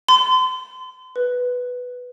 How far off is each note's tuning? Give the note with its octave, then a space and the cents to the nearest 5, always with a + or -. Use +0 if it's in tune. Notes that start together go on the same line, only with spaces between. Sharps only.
C6 -35
B4 +0